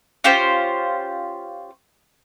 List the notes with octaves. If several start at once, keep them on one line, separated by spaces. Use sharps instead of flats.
C#4 F4 G4 C5